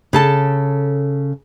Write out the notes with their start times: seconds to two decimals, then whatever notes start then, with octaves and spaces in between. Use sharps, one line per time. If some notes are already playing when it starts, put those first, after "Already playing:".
0.13 C#3 A4 A5